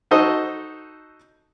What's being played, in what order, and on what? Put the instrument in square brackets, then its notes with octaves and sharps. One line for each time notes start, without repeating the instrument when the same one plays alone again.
[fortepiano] D#4 F#4 A4 C5 D#5